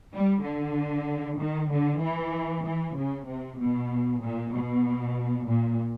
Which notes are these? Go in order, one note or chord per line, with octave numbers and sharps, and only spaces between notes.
G3
D3
D#3
D3
E3
E3
C#3
C3
B2
A#2
B2
A#2